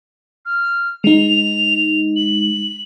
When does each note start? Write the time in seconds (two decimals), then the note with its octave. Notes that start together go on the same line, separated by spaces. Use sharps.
0.46 F6
1.04 G#3 D#4 F7
2.16 F#7